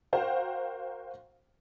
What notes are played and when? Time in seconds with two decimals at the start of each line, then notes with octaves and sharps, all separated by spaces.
0.13 F#4 A#4 C5 F5 G5